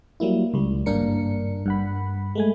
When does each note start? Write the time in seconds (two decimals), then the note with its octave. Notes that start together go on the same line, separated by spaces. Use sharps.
0.20 F#3 G3 A#3 E4
0.54 C#2 G3
0.86 G#1 G2 A#3 D4 A#4 C#7
1.66 G2 F#5 B5
2.35 G#3 A3 G#5